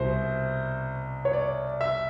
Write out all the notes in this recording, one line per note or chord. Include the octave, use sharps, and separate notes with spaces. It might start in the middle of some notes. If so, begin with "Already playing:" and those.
Already playing: C2 B2 C5
C#5
D5
E5